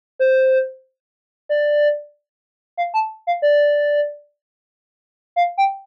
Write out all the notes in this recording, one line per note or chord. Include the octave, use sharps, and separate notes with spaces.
C5
D5
F5
A5
F5
D5
F5
G5